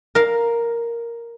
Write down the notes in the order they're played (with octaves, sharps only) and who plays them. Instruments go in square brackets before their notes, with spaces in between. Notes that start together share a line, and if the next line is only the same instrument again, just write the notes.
[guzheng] A#4 F5